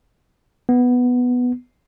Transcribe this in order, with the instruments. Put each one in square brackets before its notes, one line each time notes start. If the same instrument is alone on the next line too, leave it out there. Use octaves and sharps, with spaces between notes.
[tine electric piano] B3